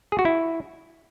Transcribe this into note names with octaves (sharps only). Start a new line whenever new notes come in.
G#4
F#4
E4